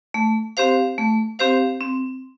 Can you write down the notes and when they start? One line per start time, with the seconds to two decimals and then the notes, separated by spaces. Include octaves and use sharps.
0.14 A3
0.57 C4 G4 C5 F5
0.98 A3
1.39 C4 G4 C5 F5
1.80 C4